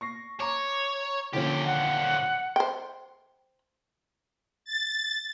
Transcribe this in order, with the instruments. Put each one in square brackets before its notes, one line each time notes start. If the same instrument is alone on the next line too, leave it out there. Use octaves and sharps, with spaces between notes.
[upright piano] C#6 A#6 C7
[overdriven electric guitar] C#5 [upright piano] A#5 C#6 D6
[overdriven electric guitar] A#2 G4 [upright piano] D3 F3 C#4
[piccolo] F#5
[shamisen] C5 G5
[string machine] A6